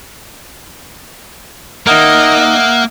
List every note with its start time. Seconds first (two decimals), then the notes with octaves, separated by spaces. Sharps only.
1.87 A#3 D#4 A#4 D#5 E5 F#5 F6